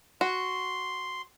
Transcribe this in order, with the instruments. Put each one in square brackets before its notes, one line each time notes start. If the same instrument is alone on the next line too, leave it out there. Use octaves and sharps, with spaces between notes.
[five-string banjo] F#4 [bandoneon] C6